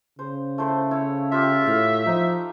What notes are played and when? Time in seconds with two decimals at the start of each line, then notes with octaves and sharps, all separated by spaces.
0.19 C#3 C5
0.58 A3 E4 C5
0.91 E4 C#5 F5
1.32 F4 G4 E5
1.67 A2 F5
2.06 F3 D#4 D#5